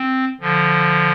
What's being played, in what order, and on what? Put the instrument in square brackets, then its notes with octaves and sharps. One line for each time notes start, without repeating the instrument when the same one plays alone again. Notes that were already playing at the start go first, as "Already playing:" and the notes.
Already playing: [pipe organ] C4
D3 F3